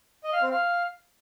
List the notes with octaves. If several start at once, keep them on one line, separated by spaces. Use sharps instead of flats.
D#5
F5
C4
F5